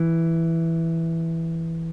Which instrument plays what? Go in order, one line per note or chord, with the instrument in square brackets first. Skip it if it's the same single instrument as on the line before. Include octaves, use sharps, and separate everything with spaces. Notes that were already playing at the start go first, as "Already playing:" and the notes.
Already playing: [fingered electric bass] E3